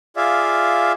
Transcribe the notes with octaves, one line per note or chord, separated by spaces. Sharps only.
F4 G#4 D5 E5 F5